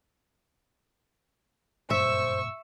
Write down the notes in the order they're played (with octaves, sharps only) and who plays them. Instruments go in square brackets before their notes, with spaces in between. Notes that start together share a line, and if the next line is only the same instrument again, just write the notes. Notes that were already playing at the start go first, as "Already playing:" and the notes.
[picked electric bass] F#1 G2 A#2 [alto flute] C5 [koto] E5 [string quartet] C#6 E6